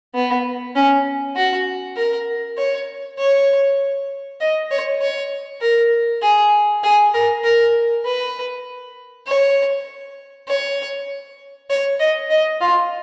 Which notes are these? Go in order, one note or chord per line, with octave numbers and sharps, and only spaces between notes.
B3
C#4
F#4
A#4
C#5
C#5
D#5
C#5
C#5
A#4
G#4
G#4
A#4
A#4
B4
C#5
C#5
C#5
D#5
D#5
F4